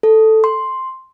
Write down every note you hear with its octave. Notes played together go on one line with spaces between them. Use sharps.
A4
C6